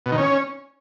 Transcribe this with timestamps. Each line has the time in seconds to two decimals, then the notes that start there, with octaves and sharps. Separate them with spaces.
0.06 B2
0.12 D#3
0.18 C#4